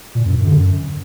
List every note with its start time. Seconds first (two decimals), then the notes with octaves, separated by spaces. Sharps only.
0.15 A#2
0.25 F#2
0.35 F#2
0.45 D3
0.56 F#2